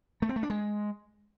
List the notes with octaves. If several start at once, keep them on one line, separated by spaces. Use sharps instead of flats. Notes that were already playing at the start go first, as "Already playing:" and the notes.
A3
C4
A3
D4
G#3